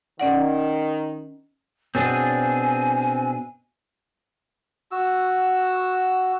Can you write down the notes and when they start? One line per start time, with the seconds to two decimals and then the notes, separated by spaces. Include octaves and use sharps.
0.19 D#3 C#4 D5 F#5
1.95 B2 C4 D4 G#4 C#5 G#5
4.91 F#4 E6